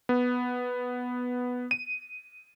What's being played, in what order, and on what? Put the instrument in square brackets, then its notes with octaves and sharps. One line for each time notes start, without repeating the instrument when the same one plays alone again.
[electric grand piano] B3
D#7